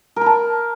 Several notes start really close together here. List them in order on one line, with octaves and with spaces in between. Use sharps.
A#4 B5 A5